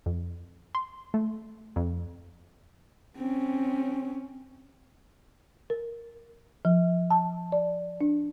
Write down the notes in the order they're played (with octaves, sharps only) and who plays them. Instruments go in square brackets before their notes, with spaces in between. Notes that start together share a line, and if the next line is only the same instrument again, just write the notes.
[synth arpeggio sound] F2
C6
A3
F2
[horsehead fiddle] C4 C#4
[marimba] A#4
F3
A5
D5
D4